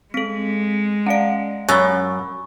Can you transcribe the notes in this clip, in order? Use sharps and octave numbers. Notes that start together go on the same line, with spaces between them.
G#3 C4 A4 B6
C#4 D5 F5 F#5 D7
F#2 C#4 B5 C#6 E6 A6